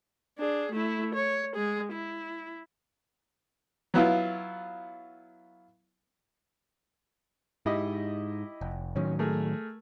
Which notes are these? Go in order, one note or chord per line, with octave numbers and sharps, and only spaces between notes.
D4 G#4
A3 E4
C#5
G#3 G#4
E4
F#3 B3 E4 F4
G#2 E4 G4 D#5
F1
A2 D#3 F#3 C#4
A3 G#4 A#4